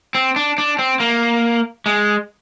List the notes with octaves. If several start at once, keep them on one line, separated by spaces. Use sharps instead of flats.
C4
D4
D4
C4
A#3
G#3